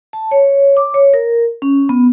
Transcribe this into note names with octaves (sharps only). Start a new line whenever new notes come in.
A5
C#5
D6
C#5
A#4
C#4
B3